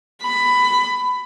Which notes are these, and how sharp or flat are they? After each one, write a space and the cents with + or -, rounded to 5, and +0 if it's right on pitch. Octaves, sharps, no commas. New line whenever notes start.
B5 +15